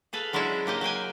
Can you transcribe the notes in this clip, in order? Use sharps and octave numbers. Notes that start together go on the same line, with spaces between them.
G#4 A4 B4 F5
F#3 G#3 C#4 D4 E4 F#4
C#3 A#3 G4 D#5
F#3 A#3 G5 G#5